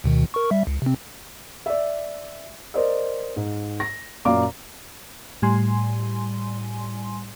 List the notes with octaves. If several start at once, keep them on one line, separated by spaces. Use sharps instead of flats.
D2 B2 D#3
A#4 C#6
G3 E5
C#2
C3 C4
D5 E5
A#4 C5 D5 D#5
G#2
A#6
F#2 A#2 D5 F5 A#5 D6
A2 G3 G#5 C6